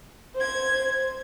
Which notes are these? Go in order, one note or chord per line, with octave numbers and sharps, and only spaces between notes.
C5 G#6